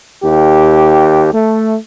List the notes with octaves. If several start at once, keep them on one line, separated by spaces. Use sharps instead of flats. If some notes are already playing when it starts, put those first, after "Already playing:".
D#2 G4
A3